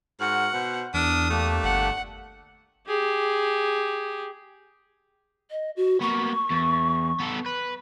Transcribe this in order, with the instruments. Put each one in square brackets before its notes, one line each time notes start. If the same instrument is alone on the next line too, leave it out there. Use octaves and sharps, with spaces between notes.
[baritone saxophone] G#2 [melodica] F#4 A#4 [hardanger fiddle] F#5
[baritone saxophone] B2 [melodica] C5
[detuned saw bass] E2 [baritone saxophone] D4 [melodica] A#4 [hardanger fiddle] D#6
[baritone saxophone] A3 [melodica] A#3 D4 G4
[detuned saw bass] G1 [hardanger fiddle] F#5
[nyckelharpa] G4 G#4
[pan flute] D#5
F#4
[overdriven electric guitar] A#3 B3 [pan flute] C#6
[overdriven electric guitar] E2
B3 A4
B4